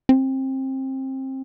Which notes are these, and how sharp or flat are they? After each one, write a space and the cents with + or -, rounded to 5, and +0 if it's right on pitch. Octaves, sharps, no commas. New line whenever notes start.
C4 +25